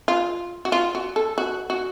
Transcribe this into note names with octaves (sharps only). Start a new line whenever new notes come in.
F4
F#4
F4
F#4
A4
F#4
F#4